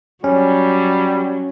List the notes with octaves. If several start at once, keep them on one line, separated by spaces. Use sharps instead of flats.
F#3 G3 C#4